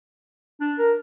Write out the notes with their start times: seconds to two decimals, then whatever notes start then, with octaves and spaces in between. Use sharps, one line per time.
0.61 D4
0.79 A#4